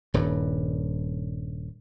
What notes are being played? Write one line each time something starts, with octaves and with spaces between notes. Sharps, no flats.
D#1 G2